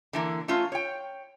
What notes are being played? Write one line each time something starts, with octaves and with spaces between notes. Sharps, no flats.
D3 E3 A#3
A3 C#4 F4
C#5 G5